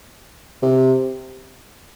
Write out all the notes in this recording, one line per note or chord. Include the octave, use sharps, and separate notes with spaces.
C3